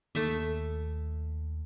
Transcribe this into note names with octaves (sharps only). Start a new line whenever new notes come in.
D#2 A3 E5